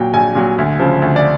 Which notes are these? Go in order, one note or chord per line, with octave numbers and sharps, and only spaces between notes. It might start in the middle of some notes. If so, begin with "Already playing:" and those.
Already playing: A#2 F#3 G5
A#1 G#5
A#2 F#3
D2
C#3 F3
D2
D5